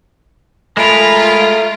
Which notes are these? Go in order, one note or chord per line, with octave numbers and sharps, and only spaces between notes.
G#3 A3 F4 A#4 A#5 B5